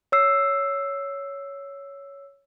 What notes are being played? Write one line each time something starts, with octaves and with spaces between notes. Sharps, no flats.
C#5 E6 C7